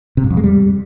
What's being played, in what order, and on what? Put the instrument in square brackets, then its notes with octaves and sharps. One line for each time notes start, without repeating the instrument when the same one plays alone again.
[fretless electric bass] C3
G2
F2
G#3
G3